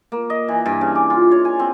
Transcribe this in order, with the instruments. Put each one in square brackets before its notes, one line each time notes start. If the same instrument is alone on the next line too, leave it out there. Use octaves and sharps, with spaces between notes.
[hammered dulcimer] A#3
D#5
E3
G2
C#3
D6
F4
C#5
G#5
C4